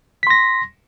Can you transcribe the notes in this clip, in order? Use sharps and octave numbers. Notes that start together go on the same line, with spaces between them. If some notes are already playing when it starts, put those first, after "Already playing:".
C6 A#6 B6